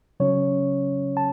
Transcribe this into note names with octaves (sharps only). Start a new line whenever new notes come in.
C#3 F#3 C#4 C#5
A5